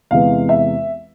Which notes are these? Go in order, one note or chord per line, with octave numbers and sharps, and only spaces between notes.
E2 C3 E3 G#3 F5
E5